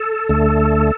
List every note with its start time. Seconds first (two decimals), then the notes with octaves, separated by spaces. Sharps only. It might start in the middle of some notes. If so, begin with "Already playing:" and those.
Already playing: A4
0.29 D2 D3 A3